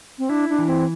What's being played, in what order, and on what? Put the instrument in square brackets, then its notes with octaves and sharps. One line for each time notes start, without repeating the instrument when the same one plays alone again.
[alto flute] C4
[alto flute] D4 [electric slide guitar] E4
[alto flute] D4
[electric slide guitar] E3
[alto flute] C4